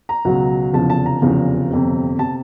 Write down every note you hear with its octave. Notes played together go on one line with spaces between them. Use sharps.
A#5
C#2 B2 F#3
F1 E2 C#3 F3 A5
A5
A#5
F1 E2 C#3 F3
G1 F2 C3
C3 A5